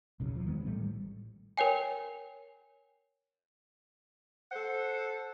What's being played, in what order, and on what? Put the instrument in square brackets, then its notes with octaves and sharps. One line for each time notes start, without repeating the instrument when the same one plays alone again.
[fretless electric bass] F1 B1 C#3
E2 F3
D#3 G#3 B3
A1 A2 G3 A3
[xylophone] A#4 C#5 G5 G#5
[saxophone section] A4 C5 F#5